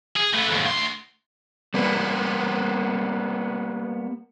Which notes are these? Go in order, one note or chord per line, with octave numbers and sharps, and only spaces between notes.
G#4
A3 B4
D#2 G#2
D2 C6
G3 A#3 B3 B4